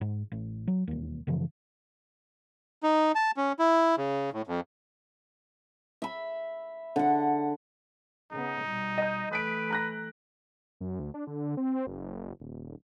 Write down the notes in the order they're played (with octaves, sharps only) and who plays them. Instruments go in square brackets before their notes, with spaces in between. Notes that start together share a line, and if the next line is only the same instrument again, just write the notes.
[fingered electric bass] G#2
A1
F#3
E1 D#2
F#2 C#3 E3 F3
[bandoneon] D#4
A5
C#4
E4
C#3
A2
F2
[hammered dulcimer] E5 B5
D3 F#5
[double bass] C#3 B3 [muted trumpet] D#4
[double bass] B2 G3
[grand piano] D#5 G6
[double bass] E3 A3 [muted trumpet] B4 [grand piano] D#6 B6 D7
[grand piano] A#5 F#6 A#6
[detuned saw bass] F#2
D2
D4
D3
C4
F#1
D#1